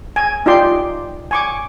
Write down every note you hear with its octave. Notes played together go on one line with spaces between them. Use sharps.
G#5
D#4 F4 G4 D5 G5 C6
G#5 C#6 D6